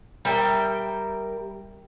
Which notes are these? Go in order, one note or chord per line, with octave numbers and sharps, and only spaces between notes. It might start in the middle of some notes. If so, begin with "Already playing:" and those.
G3 A#4 E5 G5